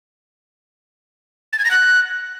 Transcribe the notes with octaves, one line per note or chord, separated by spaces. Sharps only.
A6
G#6
A#6
F#6